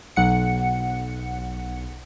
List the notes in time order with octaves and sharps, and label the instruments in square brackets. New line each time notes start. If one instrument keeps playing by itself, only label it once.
[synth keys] B1 F#5 C#7